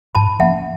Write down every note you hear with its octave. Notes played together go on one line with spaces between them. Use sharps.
G#2 A5 B5
F3 A#3 C#4 E5 F#5